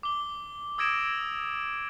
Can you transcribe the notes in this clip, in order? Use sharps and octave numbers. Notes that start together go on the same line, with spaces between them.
D6 G7
D#6 E6 G#6 A#6 D7 E7